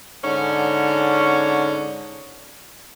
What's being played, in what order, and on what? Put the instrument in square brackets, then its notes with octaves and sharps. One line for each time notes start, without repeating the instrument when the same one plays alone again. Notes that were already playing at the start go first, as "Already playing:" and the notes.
[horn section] G#2 D3 C#4